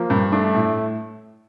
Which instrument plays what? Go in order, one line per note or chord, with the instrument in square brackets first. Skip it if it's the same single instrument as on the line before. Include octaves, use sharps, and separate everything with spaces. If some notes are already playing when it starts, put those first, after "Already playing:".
Already playing: [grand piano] F3 [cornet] A#3
[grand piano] G2
[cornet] A3 [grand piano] D4
[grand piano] A2